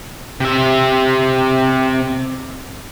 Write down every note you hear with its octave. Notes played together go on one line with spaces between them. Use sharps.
C3 E5